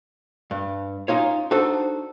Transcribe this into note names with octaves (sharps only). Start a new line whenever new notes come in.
G2
C#4 D#4 F4 C#5
D4 D#4 F#4 A4 C5